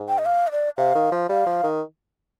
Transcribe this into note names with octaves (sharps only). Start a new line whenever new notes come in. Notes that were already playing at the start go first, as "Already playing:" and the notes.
Already playing: G#2
G5
D#5
F5
D#5
D5
C3 F5
D#3
F3
G3 F5
F3
D#3